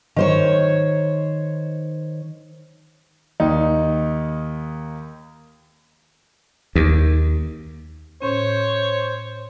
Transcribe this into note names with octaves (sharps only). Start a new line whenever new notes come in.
D#3 C5 C#5
D#2 D#4
D#2
A2 C#4 C5 C#5